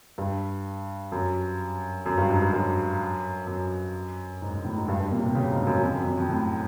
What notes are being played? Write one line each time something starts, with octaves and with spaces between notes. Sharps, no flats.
G2
F#2
F#2
G2
G#2
G2
F#2
F#2
G#2
G#2
A2
G#2
G2
G2
A#2
C3
B2
C#3
G#2
F#2
F#2
F2
F#2
F2
F2
A2